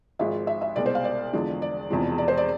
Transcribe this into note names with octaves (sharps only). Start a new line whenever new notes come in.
G#1 G#2 F3 G#3 E5
E5
E5
C2 B2 G#3 D5
C5
F5
D5
E2 D3 F3 G#3
D5
E1 E2 C3 F3 G#3
D5
C5
D5